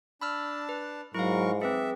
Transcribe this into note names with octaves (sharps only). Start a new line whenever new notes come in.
D4 A5 B5 E6 F6
B4
G#2 F#3 E4 A#4 F5 C#6
C4 G#4 B4 E5